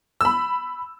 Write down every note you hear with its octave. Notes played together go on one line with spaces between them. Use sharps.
B5 E6